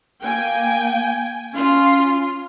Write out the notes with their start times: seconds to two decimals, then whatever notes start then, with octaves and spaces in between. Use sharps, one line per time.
0.22 A#3 G5 G#5
1.53 C#4 F4 C6